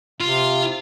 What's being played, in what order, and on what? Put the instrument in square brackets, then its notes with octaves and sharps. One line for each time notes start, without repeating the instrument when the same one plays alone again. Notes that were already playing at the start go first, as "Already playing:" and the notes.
[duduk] C3 [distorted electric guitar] F4